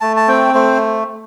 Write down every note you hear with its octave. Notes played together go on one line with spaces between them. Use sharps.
A3 A5
A5
C4 G5
A3 C5